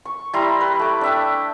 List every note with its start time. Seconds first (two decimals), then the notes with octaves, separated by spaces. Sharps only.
0.05 C#6
0.33 G3 E4 A#5 C6
0.61 B4
0.79 A3 D6
1.01 D4 E5 G5